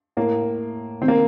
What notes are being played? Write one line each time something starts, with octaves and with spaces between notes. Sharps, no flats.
A2 A#3
D#3 C4
A#3